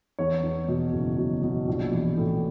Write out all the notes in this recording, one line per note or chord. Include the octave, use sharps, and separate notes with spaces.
E2 C#5
E2
B2
F#1
B2
B2
A#1
E3
A2